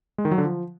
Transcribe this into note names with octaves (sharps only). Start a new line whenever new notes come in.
G#3
D#3
F#3
D3
F3